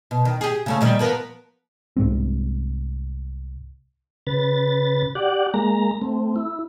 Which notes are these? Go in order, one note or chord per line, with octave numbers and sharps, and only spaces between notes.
B2
D#3
G4 G#4
C#3 A3 C#4
A#2 D#3 G3
F3 B3 A#4
C2 G#2 G#3 C4
C#3 B4 A6
G4 D5 F#5
G#3 A#3 A#5
A3 C4
E4